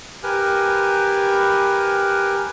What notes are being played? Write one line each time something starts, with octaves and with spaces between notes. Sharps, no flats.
G4 A#4 B4 G#5